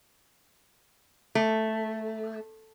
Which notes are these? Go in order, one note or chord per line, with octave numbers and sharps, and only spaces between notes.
A3